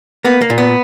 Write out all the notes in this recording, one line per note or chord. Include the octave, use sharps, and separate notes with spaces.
A#3 B3
A#3
A#2
B3